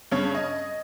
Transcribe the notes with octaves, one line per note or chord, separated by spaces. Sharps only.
G2 C#3 C#5 G#6
D#5